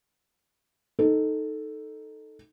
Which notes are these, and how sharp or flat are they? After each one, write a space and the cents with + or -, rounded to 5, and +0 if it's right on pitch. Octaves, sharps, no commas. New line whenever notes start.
D#4 +0 A4 +0